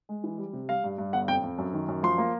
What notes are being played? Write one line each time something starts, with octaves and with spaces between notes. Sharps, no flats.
G#3
E3
G3
C3
G3 F5
G2
G2
G1 F#5
F2 G5
F2
F#2
D#3
F#2
F3 C6
A#3